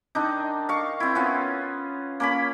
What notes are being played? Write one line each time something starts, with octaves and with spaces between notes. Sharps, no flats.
D#3 D4 D#4
F5 C#6
C4 E4
B3 C#4 F4
A#3 C#4 B5